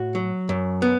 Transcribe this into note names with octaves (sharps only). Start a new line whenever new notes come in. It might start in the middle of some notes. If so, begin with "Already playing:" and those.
Already playing: A2 F#4
F#3
F#2
B3